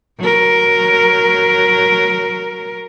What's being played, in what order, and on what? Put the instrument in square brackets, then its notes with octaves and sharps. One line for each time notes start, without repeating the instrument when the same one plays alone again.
[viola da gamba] F#3 A#4